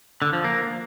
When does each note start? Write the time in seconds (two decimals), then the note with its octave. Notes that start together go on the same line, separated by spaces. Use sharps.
0.22 D3
0.33 F3
0.44 A#3